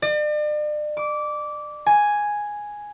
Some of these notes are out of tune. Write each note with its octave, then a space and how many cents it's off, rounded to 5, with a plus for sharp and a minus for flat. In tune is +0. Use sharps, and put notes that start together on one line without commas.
D5 +40
D6 -15
G#5 +0